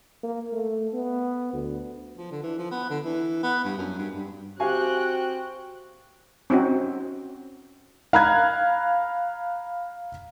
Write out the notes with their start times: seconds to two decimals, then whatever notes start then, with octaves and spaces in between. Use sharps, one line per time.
0.23 A#3
0.53 A3
0.94 B3
1.53 D2
2.17 F3
2.32 D3
2.43 E3
2.59 F3
2.71 B3
2.90 D3
3.05 E3
3.43 B3
3.65 G2
3.78 F#2
3.99 G2
4.15 G2
4.60 C4 F#4 G4 F5 G5 G#5 F#6
6.50 C4 C#4 D#4 F#4
8.13 F5 A#5 B5 F#6 G#6